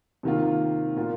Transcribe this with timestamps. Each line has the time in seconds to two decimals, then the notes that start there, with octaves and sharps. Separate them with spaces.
0.23 C3 D#3 A#3 F4
0.96 A#2 A#3 F4